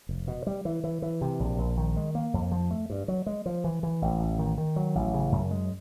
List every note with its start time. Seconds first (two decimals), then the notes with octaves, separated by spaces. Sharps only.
0.09 F1
0.28 B2
0.47 G3
0.65 E3
0.84 E3
1.02 E3
1.21 C3
1.40 A#1
1.58 A#1
1.77 D#3
1.97 G#3
2.15 A#3
2.34 F2
2.52 F3
2.71 A3
2.90 G2
3.08 F#3
3.26 G#3
3.46 F3
3.64 E3
3.83 E3
4.02 A1
4.20 A1
4.39 D#3
4.58 D#3
4.76 F#3
4.95 A1
5.14 C#3
5.32 F#2
5.51 G#3